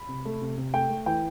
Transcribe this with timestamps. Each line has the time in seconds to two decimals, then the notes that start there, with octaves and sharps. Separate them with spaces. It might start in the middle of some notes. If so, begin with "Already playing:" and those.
Already playing: B5
0.09 C3
0.25 A3
0.41 C3
0.57 C3
0.74 A3 G5
0.90 A3
1.06 E3 G5